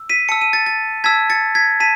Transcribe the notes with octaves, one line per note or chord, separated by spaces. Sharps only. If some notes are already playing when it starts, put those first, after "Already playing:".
Already playing: E6
B6 D#7
A5 E6 C#7
D#7
A6 C#7
A6
A5 E6 G#6 B6
A6 C#7
G#6 B6
A5 B6 D#7